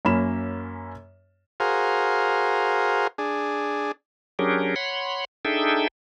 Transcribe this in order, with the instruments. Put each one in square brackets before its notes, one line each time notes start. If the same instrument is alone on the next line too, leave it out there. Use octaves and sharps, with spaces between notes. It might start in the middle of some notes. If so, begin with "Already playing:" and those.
[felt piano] F#2 A#3 C#4 B5 E7
[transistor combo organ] F#4 G#4 A#4 C5 F5
D4 G#4
[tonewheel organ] F#3 C#4 D4 G4 G#4 A#4
C#5 F#5 B5 C6
D4 D#4 G#4 A4 E5 G5